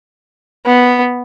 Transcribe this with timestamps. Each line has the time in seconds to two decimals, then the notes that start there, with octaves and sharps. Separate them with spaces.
0.66 B3